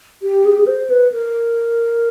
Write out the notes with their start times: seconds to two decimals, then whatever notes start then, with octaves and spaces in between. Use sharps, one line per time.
0.22 G4
0.45 G#4
0.52 G4
0.59 G#4
0.67 C5
0.90 B4
1.12 A#4